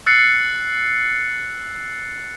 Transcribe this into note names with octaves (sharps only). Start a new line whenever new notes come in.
E6 F#6 A6 C7 C#7